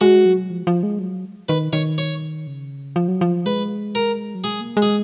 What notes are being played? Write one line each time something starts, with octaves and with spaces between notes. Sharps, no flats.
G#3 F#4
F#3
F3
F3
G#3
F#3
D#3 B4
D#3 C#5
C#5
C#3
F3
F#3
F3
G#3 B4
A#4
F#3
G#3 G#4
A#3
G#3
G#4